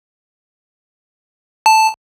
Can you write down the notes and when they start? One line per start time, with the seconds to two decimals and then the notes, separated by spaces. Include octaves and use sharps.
1.66 A5